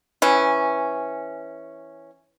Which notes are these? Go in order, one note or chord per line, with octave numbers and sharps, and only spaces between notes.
E3 C#4